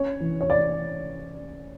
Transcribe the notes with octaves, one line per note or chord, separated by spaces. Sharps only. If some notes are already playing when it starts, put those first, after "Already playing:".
Already playing: C#4 C#5
E3
C#5
E3 D5